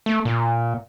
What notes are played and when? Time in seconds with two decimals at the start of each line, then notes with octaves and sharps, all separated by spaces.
0.06 A3
0.25 A#2